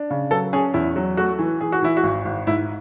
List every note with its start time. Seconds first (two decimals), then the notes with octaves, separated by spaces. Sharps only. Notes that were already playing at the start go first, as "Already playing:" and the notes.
Already playing: D4
0.10 C#3
0.31 F#3 A4
0.53 C#4 G#4
0.74 E2 E4
0.96 F#3
1.17 A3 F#4
1.39 E3
1.61 E3 G#4
1.72 F#4
1.82 E3 E4
1.97 F#4
2.03 G#1
2.25 G#1
2.47 G#2 E4